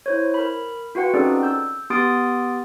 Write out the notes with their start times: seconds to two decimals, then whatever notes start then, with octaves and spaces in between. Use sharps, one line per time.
0.06 E4 C5 C#5
0.34 A#4 B5
0.95 F4 F#4 B4 F#5 G5
1.13 C4 C#4 D#4 G#4 A4 D5
1.43 E6 G6
1.90 B3 G4 C6 D#6 A6 D7